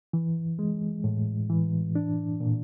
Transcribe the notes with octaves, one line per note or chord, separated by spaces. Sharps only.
E3
G#3
A2
E3
D4
A#2